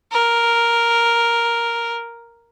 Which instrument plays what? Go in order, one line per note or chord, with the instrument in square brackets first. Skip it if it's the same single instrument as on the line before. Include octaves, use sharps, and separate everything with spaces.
[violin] A#4